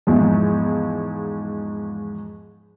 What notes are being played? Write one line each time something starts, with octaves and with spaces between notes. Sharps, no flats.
E2 G#2 F3